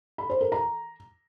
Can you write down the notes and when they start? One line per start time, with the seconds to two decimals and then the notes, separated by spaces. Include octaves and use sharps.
0.18 B5
0.30 C5
0.41 A#4
0.52 A#5